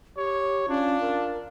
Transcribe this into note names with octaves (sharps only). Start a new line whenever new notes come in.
G4 C#5
C#4 D4 F4
A#4